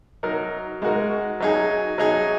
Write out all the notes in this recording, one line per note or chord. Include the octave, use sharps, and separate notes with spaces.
F#3 D#4 A#4
G#3 D#4 F#4 A#4
F#3 D#4 G#4
F#3 D#4 G#4